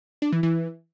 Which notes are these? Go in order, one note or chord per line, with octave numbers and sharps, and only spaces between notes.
D4
E3
E3